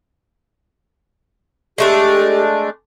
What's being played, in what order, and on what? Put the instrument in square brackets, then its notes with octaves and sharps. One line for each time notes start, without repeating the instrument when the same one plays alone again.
[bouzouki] G#3 A3 D4 [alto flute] G4